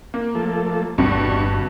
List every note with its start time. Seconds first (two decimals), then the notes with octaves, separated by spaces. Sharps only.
0.14 A#3
0.35 F3 A3 A4
0.98 G1 G2 B2 C4 D4 C#6